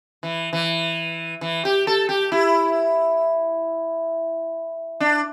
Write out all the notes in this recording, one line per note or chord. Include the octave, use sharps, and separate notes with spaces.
E3
E3
E3
G4
A4
G4
E4
D4